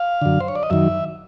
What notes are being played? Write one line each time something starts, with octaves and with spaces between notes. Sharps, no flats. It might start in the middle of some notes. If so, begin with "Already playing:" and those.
Already playing: F5
F#2 D3
C5
C#5
D5
D#5
F#2 D#3 E5